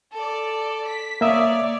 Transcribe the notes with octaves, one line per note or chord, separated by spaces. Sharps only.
A4 D5
B6
A#3 C#5 D5 E5 D#6